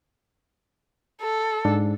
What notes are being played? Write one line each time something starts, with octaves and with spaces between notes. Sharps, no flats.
A4
G#2 D4